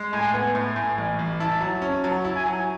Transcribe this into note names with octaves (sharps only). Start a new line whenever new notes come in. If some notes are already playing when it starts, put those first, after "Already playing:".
Already playing: G#3
A2 G#5
B3
A2
A2 G#5
A1
A1
E4 A5
F#3
C#4
F#3 A5
E4
G#5
F#3